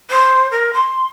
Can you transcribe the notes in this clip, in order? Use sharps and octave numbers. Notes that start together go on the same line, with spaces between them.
C5
A#4
C6